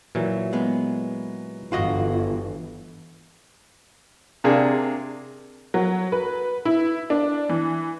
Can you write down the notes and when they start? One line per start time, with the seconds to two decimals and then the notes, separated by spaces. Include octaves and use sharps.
0.15 A#2 E3 F#3
0.53 G#3 B3
1.72 G1 E3 F4 F#4 D#5
4.44 C3 A#3 D4 G#4
5.74 F#3
6.12 B4
6.65 E4
7.10 D4
7.49 E3